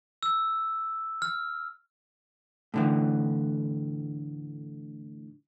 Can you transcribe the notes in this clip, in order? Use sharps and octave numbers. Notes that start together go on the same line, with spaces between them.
E6
F6
A2 D3 E3